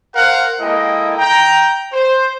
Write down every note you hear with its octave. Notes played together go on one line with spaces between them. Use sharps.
A#4 C5 F5 F#5
G#3 A#3 E4 A4 D#5 G5
G5 A#5
C5